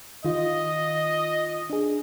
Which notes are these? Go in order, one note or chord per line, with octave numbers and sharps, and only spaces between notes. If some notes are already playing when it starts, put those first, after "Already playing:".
D#3 F4 D#5
D4 G#4